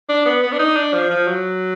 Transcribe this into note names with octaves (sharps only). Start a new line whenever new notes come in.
D4
B3
B3
D4
D#4
D4
F3
F3
F#3